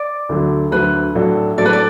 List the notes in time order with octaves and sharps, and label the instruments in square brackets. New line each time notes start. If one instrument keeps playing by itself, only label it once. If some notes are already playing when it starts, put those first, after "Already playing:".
Already playing: [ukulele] D5
[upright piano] D2 D3 F#3
[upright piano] D2 D3 F#3 [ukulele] B4
[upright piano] A2 F#3 D4 A4
[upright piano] A2 F#3 D4 A4 [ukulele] D5
[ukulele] B4
D5